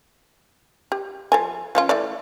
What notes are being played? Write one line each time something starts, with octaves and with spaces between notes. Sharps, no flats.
G4
F3 A4 G#5
F3 C#4 F4
E3 A3 D5